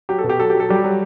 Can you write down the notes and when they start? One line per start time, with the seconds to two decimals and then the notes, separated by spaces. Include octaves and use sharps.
0.09 F#3 G4
0.19 A4
0.24 B2
0.29 G4
0.39 F#3 A4
0.50 F#3 G4
0.60 A4
0.69 F#3 G3 G4
0.84 F#3